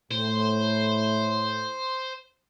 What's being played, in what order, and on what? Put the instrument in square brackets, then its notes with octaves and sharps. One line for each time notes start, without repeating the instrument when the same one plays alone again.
[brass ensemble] A2 [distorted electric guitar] C5